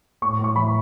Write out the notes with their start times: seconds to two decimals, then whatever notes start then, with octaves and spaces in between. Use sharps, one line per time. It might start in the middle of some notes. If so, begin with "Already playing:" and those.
0.22 A2 C#6
0.39 A2
0.44 C#6
0.56 E3 B5